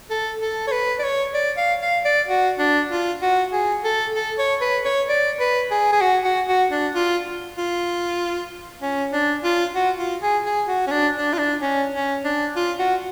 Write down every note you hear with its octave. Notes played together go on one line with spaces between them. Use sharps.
A4
A4
C#5
B4
D5
C#5
D5
F5
F5
D5
F#4
D4
F4
F#4
G#4
A4
A4
C#5
B4
C#5
D5
B4
G#4
G#4
F#4
F#4
F#4
D4
F4
F4
C#4
D4
F4
F#4
F4
G#4
G#4
F#4
C#4
D4
D4
F4
D4
C#4
C#4
D4
F4
F#4